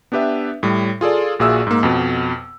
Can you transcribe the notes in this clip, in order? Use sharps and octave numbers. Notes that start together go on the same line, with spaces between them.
B3 D4 G4 B4 E5
A2 G3
F4 G#4 A4 D5
A#1 A#2 F#4 G#4 E5 E6
G#2 A#3
F2 B2